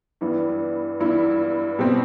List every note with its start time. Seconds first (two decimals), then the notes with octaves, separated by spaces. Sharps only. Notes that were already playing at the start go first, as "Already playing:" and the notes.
0.21 G2 E3 B3 E4
1.00 G2 E3 B3 E4
1.79 B2 G3 C4